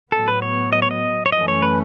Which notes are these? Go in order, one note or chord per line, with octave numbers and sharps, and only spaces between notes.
A2 F#3 B3 A4
B4
C#5
D#5
C#5
D#5
C#5
F#2 E3 A3 C#4 D#5
C#5
B4